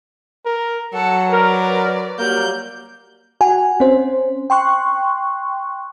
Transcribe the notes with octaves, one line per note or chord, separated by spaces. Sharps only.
A#4
F#3 A4 F#5
A#4 B4 D5
F#3 G3 A#3 G6
F#4 F#5 G#5
C4 C#4 C5
G5 C6 C#6 F#6